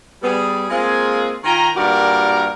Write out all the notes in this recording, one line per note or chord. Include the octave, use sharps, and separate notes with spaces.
G3 B3 G#4
G#3 A#3 C4 F4 G#4
D#3 F4 G5 G#5 A#5
G2 A#2 F#4 G4 A#4 D5